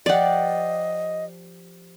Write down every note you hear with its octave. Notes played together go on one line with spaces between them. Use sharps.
F3 G4 D5 D#5 F#5